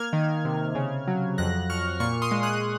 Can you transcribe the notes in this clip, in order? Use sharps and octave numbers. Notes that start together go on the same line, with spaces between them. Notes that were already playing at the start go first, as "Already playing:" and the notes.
Already playing: A#3 F6 G#6
D#3
C3
C#3
F#3
F2 F#6 A#6
F2 C#6 F6
A#2 C#6 F6
C6 D#6
G#3
D#6 F#6